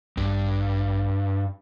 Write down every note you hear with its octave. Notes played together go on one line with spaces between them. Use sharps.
A1 G2